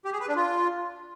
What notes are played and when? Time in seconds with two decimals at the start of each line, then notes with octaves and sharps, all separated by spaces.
0.05 G4
0.13 G#4
0.20 B4
0.28 D4
0.36 F4